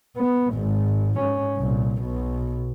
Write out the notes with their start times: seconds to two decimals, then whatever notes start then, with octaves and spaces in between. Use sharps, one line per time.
0.17 B3
0.54 G#1 G#2
1.19 G#2 C#4
1.57 C2 A#2
2.01 B1 B2